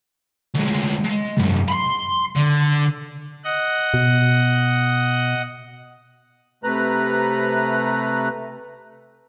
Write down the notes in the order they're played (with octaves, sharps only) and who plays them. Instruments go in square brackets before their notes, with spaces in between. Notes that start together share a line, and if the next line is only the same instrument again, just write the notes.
[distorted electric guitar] D2 G#3
G#3
C2 F#2
B5 C6
D3
[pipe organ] D#5 F#5
[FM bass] B2
[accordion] C3 A3 B4 A#5 F#6